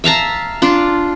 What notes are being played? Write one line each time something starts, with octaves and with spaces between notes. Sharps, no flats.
E5 F5 A5 A#5
D4 F4